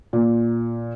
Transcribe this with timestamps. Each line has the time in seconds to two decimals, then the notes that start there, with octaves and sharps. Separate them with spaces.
0.13 A#2